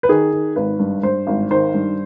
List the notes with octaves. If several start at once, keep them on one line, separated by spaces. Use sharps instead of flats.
B4
D#3 G#4
D#3
G#1 B4
G2
G2 C5
G#1
D#3 C5
G2